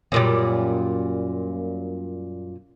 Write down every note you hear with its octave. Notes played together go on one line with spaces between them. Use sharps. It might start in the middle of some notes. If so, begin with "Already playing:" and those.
F#2 A#2 G3